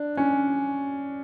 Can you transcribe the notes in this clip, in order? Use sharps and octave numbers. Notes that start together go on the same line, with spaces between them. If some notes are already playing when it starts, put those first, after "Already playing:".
Already playing: D4
C#4